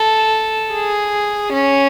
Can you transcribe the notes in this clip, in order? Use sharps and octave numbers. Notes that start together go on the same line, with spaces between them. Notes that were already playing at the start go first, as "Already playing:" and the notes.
Already playing: A4
G#4
C#4